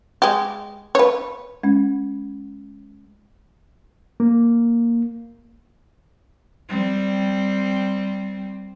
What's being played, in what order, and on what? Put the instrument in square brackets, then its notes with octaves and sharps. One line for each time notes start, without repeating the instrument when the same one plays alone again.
[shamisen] G#3 G4
B4 C#5
[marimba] G#3 C#4
[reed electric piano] A#3
[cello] G3 C4